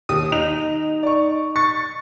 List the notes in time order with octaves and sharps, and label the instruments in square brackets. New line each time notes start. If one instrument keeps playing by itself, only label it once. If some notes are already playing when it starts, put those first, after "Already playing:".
[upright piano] D#2 [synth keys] D#6
[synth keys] D#4 [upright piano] F7
[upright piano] D5 C#6
[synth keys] C#6 [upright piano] A6